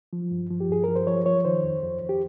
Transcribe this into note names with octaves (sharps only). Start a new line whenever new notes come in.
F3
G2
F3
G4
G2 G#4
F3 A#4
C5
F3 C#5
F3 C#5
D#3 C5
F2
F2
F2
G4